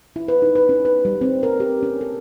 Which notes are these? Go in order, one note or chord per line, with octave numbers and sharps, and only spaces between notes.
E4
B4
D#4
B4
C#4
B4
G3
C4
A#4
G4
C#4
A4